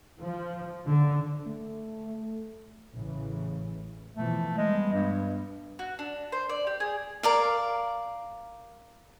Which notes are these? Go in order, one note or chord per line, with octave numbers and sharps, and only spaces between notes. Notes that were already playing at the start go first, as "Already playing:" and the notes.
F3
D3
A3
A1 C#3 E3
B2 E3 F3 A3
G3 G#3 B3
G2
F#4
D4
C5
D5
G4
G#4
A#4 D5 F5